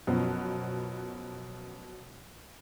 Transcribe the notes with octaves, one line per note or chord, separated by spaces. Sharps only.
F#2 B2 F3 B3